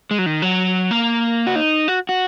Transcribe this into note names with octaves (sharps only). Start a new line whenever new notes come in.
G#3
F#3
D#3
F#3
A#3
F#4
D#4
F#4
F#4